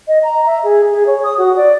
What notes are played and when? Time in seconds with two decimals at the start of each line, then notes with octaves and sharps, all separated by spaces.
0.08 D#5
0.23 A#5
0.47 E5
0.64 G#4
0.91 G#4
1.07 C#5
1.24 D#6
1.38 F#4
1.56 D5